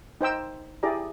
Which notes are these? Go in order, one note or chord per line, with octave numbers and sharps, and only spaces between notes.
D#4 C5 G5 E6
E4 G4 G#4 D5 A#5